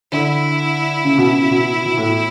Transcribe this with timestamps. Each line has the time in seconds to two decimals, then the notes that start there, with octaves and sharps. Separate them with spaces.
0.11 D3 E4
1.05 C#3
1.18 B2
1.31 C#3
1.51 B2
1.85 B2
1.97 A2